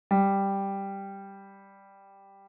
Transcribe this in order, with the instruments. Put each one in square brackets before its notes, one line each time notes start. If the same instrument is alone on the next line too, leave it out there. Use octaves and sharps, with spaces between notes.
[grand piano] G3